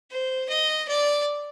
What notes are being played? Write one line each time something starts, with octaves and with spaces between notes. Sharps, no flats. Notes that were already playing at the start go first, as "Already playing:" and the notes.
C5
D#5
D5